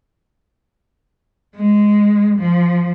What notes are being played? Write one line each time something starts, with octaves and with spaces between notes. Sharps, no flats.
G#3
F3